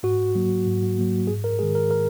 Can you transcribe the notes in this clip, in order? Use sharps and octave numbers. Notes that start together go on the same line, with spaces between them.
G#2 F#4
F#3 A#3
G#2
F#3 A#3
G#2 G#4
A#4
D#3 G#3 G#4
A#4
A#4